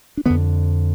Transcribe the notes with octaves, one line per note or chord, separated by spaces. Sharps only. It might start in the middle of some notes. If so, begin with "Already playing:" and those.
D4
F2 D3 B3